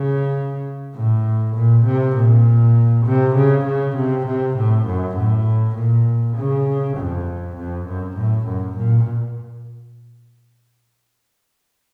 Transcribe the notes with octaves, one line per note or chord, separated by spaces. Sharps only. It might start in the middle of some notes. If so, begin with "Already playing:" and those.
Already playing: C#3
A2
A#2
C3
A#2
C3
C#3
C#3
C3
C3
A2
F#2
A2
A#2
C#3
F2
F2
F#2
A2
F#2
A#2